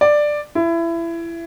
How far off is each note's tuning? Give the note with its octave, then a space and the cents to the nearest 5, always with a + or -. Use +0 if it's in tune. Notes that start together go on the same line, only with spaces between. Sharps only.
D5 +10
E4 +25